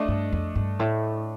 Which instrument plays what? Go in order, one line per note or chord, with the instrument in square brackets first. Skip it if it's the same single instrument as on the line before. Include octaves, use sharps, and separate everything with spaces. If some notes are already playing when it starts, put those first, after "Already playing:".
Already playing: [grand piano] A3 D4 A4 D#5
[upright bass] G2
F2
G2
A2